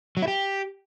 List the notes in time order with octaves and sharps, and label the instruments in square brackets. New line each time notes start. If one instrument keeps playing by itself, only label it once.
[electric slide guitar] F#3
E4
G4